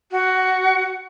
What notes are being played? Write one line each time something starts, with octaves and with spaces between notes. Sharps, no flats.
F#4